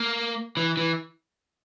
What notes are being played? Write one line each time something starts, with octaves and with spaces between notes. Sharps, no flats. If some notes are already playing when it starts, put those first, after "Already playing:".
Already playing: A#3
E3
E3